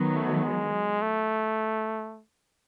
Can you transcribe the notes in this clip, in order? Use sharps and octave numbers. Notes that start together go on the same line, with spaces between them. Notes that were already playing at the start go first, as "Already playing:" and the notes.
Already playing: D#3 F#3 B3
A3
G#3
A3